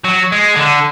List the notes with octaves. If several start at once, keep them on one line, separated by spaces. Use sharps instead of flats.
F#3
G#3
D3